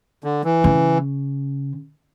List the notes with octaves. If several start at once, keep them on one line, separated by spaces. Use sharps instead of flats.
D3
E3
C#3